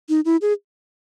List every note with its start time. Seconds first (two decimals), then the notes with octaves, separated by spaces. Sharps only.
0.09 D#4
0.25 E4
0.42 G#4